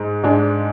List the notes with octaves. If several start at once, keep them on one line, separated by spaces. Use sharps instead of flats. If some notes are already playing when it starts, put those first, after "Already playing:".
Already playing: G#2 G#3
G#2 G#3 D4